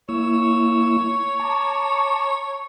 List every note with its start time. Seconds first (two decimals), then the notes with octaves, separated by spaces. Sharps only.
0.09 A#3 E4 C#5 E6
1.40 A5 A#5 D6